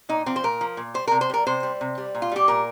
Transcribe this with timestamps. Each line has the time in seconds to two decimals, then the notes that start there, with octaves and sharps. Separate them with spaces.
0.09 A#2 D#4
0.26 F3 C4
0.36 C5
0.44 A#2 A#4
0.61 F3
0.77 A#2
0.94 G3 C5
1.07 A#4
1.12 C3
1.21 C5
1.30 G3 A#4
1.47 C3 C5
1.63 G3
1.81 C3
1.98 G3
2.15 A#2
2.22 F4
2.32 G3 G4
2.48 A#2 A#4